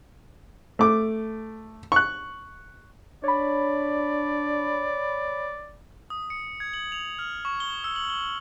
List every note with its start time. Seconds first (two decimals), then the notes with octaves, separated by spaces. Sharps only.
0.79 A3 D6
1.92 C#6 F#6
3.24 D4 C#5 D5 B5
6.10 D#6
6.30 C#7
6.60 G#6
6.73 F#7
6.92 F7
7.19 F6
7.45 C#6
7.60 G7
7.84 E6
7.96 F#7
8.10 G7